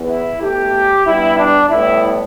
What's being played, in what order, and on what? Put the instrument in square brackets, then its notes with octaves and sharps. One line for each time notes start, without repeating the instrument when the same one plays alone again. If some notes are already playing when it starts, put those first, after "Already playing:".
Already playing: [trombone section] E2 E3 B3
E4
B1 A2 A3 G4
G2 G3 B3 E4
D4
A2 G3 B3 E4